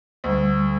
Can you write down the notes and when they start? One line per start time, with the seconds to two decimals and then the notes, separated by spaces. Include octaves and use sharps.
0.24 D2 G3